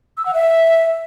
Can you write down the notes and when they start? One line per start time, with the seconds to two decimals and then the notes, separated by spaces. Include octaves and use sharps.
0.17 E6
0.26 F#5
0.34 E5